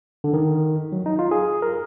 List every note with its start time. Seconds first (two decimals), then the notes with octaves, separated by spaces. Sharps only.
0.24 D3
0.33 D#3
0.92 F#3
1.06 D#4
1.19 F4
1.31 G#4
1.62 A#4